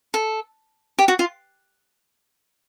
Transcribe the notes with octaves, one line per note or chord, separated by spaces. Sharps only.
A4
G4
F#4
F4